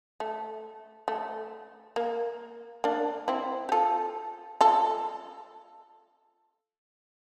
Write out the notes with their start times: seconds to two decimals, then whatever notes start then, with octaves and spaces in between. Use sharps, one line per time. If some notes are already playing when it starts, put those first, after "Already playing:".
0.20 A3
1.08 A3
1.96 A#3
2.84 A#3 D4
3.28 C4 E4
3.69 G4
3.72 F4 A4
4.61 F4 A4